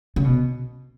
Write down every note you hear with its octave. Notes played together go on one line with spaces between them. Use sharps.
C#3
B2